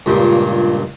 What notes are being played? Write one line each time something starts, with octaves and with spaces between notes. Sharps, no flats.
C#2 G2 A#2